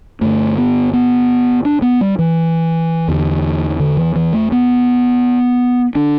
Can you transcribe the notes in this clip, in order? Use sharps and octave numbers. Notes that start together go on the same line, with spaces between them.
G2 D3 A3
B3
B3
D4
B3
G3
E3
E2 D3
D3
E3
E3
A3
B3
D3 D4